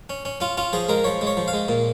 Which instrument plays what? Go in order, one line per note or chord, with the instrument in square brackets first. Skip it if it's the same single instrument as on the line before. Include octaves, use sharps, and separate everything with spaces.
[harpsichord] C#4
C#4
C#4 F4
C#4 F4
F3 G#4
G#3 A#4
F3 C#5
G#3
C#5
F3
F5
G#3
A#2